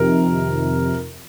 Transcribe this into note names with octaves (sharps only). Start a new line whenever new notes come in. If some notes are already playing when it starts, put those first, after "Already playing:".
Already playing: F2 C3 D#3 A#4